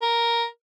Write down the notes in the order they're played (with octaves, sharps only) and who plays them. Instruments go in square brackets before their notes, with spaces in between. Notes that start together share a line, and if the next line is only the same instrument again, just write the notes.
[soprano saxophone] A#4